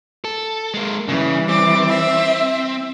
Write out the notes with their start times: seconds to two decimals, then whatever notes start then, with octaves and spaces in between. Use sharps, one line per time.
0.25 A4
0.74 G#3 A#3
1.09 C#3 E3 G3
1.49 C4 D6
1.89 E5